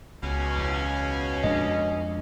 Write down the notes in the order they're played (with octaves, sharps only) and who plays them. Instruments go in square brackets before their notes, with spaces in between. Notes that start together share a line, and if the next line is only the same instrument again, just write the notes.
[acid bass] C#2 [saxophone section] B2 C#4
[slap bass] E2
[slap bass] F2 G#3 D4 [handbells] D#5